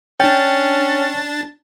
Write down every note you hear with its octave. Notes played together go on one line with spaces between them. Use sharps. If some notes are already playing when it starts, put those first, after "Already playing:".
C#4 D4 G5 A6